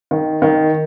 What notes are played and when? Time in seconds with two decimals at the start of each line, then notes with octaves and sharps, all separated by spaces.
0.11 D#3
0.42 D#3